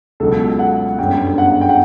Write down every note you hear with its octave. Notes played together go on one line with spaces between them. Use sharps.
C#2 B2 F#3 A4
F#5
G1 F#2 D3 G3 G5
F#5
G5
F#5